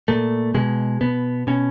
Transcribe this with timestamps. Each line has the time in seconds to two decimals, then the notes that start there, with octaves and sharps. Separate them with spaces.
0.08 A#2 A3
0.54 B2 G#3
1.01 B2 B3
1.47 B2 C#4